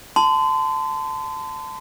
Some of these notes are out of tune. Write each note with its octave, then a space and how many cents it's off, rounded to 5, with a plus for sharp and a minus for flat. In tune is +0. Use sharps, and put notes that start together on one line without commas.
A5 +0 C6 -35